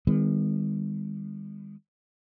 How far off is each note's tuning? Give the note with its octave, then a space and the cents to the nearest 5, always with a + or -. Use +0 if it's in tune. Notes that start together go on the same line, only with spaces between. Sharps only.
D#3 +0 G#3 -45 B3 +45